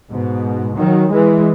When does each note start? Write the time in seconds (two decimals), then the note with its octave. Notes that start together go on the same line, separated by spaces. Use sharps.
0.11 G#2 B2
0.78 D#3 F#3
1.12 E3 G#3